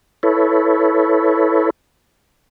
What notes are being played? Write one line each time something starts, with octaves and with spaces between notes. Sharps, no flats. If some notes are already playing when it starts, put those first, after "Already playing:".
E4 A4 B4 C#5